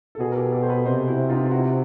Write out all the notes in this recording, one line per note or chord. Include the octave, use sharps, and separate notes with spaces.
A4
B2 F#4 G#4
A#4
G4 A4
G4 A4
C5
A4 B4
C3 A#4 C5
E4 F#4
D#4 F4
F4
E4 F#4